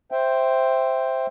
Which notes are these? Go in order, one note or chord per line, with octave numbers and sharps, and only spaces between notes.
C5 E5 G5